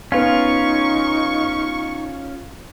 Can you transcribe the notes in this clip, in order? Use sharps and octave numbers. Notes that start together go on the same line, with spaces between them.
B3 C#4 D#4 F4 F5 C#6